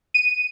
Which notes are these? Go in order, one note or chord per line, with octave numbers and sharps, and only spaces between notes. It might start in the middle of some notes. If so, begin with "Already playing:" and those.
D#7